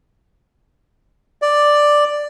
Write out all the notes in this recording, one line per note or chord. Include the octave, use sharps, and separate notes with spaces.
D5